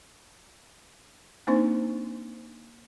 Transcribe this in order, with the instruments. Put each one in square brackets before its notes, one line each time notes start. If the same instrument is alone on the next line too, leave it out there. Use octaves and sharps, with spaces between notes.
[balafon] A#3 C4 D4 D#4 C5